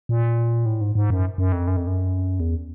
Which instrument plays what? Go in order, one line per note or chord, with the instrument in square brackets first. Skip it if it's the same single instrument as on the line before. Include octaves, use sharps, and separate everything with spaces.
[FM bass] A#2
A2
G#2
G#2
F#2
F#2
F2
F#2
F2
F#2
E2